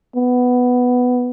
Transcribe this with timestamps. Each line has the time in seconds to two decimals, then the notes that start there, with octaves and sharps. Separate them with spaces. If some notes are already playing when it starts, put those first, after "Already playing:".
0.16 B3